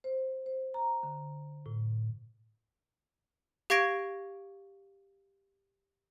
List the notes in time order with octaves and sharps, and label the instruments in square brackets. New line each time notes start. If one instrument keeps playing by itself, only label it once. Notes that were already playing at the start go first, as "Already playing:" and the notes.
[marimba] C5
C5
A#5
D3
A2
[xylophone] G4 F5 C#6 G#6 A#6 D7